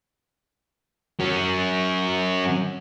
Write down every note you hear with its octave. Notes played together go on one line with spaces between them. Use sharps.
F#3 C#4